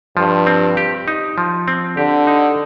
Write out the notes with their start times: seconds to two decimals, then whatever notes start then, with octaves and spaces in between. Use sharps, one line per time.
0.17 G2 F3
0.47 C4
0.77 G4
1.08 D#4
1.38 F3
1.68 C4
1.97 D3 G4
2.27 D#4